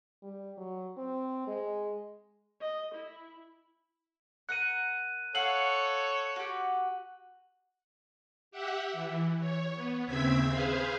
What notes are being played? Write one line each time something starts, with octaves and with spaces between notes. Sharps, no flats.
G3
F#3
C4
G#3
D#5
E4
A#4 F#5 F#6 D#7
A4 C#5 F5 F#5 F#7
F#4 G4
G4 E5 F#5
E3
C#5
B3
D#2 C#3 C4 E5 G#6 B6
G#4 B4 C5 F5